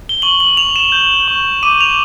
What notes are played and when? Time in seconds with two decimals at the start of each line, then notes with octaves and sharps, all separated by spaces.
0.09 G7
0.22 C#6 F#7
0.40 F#7
0.57 C#6 F7
0.76 E7
0.92 G6
1.28 C#6
1.63 D6 D#7
1.81 F7